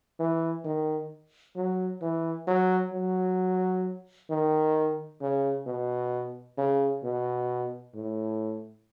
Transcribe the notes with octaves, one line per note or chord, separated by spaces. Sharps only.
E3
D#3
F#3
E3
F#3
F#3
D#3
C#3
B2
C#3
B2
A2